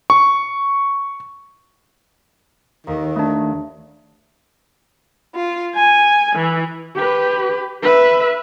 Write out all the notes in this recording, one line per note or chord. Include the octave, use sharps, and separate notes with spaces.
C#6
D#2 D#3
A3 D4
F4
G#5
E3
G4 B4
B4 E5